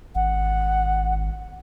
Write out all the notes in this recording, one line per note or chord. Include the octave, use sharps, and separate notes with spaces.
G#1 F#5